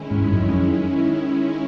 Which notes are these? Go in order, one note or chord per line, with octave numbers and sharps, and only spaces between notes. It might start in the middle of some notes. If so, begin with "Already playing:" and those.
Already playing: D#3 G#3 C#4 E4
G#2
G2
F#2
F2
F#2